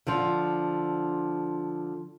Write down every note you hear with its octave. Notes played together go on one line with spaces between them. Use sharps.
D3 F3